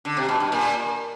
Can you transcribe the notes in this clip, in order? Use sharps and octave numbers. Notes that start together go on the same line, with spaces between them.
D3
C3
B2
G2
A#2